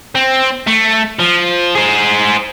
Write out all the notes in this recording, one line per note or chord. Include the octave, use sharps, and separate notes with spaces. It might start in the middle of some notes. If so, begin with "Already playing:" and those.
C4
A3
F3
G#4 C5